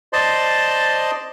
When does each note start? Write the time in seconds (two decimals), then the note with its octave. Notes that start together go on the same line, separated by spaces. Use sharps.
0.13 C5 D5 D#5 A5 C6